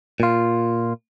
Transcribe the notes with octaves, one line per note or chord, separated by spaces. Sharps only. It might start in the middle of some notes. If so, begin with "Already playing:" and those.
A#2 F4